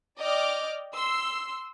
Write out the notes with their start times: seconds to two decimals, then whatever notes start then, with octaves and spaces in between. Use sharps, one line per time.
0.18 D5 D#5 G5 D6 F6
0.95 C6 E6